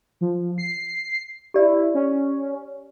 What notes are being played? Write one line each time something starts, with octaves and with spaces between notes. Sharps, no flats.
F3
C7
E4 G4 D5
C#4